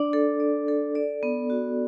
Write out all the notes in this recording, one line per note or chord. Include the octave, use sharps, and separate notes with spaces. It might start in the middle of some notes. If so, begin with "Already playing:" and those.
Already playing: D4 D5
A4
D5
A4
D5
B3
F#4